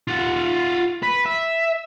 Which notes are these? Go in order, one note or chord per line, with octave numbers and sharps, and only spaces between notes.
F4 F#5
B4
E5